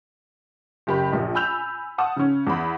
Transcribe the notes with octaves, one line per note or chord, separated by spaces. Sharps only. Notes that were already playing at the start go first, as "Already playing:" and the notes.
F#1 G4 B5
A#1
G#5 B5 E6 G6 F7
F#5 A5 D#6
C#3 C#4
E2 F#5 B5